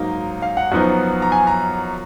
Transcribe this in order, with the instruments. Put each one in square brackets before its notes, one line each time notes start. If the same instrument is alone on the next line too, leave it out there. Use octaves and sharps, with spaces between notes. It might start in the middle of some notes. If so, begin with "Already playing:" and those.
Already playing: [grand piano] G#2 F#3 A#3 D#4
F5
F#5
F#2 F3 B3 D#4
A#5
G#5
A#5